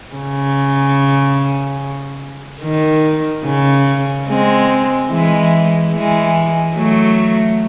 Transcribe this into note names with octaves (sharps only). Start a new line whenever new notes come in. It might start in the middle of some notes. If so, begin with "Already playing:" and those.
C#3
D#3
C#3
G#3 C4
E3 G#3
E3 G#3
F#3 A3